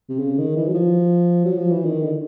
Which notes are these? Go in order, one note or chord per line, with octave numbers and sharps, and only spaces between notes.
C3
C#3
D#3
E3
F#3
F3
F#3
F3
E3
D#3
D3